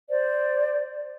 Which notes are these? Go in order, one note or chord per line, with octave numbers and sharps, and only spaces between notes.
C5 D5